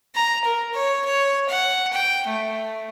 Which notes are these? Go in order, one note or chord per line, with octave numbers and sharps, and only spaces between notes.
A#5
A#4
C#5
C#5
F#5
G5
A3